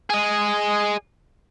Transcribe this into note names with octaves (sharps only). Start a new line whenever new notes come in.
G#4 D#5